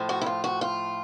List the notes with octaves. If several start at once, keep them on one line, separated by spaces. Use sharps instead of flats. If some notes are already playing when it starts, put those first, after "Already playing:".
Already playing: A2 F3
F#4
E4
F4
F#4
F4